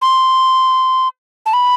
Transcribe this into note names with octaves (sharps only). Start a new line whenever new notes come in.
C6
A5
B5